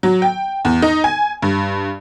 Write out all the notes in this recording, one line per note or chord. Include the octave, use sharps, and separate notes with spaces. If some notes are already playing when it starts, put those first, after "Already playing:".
F#3
G5
E2
D#4
G#5
G2